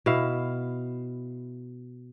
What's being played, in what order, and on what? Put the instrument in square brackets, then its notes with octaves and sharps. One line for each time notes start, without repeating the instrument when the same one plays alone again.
[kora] B2 E4 E5 F5